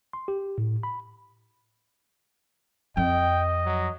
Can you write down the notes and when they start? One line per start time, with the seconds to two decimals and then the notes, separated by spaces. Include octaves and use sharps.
0.13 C6
0.28 G4
0.58 A2
0.83 B5
2.97 F2 D#5 G5
3.65 F#3